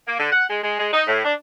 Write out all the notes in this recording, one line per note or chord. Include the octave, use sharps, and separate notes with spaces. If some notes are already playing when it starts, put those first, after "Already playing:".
A#3
D3
F#5
G#3
G#3
G#3
D#4
A2
D4